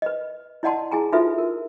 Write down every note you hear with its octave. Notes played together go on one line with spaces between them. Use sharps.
B4 D#5
E4 D5 D#5 F#5 A5 C6
E4 G#4 G#5 A#5
D#4 F4 F#4 A4 B4 E5
A#4